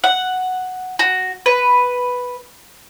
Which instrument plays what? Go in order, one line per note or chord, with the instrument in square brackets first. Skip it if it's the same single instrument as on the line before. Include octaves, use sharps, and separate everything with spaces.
[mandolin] F#5
F#4
B4